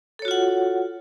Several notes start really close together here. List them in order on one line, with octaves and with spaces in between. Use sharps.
A4 C#5 F#4 F4 F#5